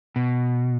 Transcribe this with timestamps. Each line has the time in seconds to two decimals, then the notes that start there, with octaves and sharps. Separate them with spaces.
0.16 B2